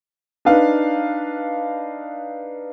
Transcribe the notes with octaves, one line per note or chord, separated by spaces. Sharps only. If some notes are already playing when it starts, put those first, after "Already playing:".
D4 D#4 B4 F5